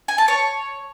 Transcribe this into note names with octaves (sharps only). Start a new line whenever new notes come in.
G#5
A5
C#5